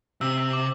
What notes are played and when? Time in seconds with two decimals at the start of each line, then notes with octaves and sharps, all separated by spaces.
0.21 C3 E6
0.38 E6
0.53 D6